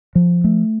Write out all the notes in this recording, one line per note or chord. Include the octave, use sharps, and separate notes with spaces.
F3
A3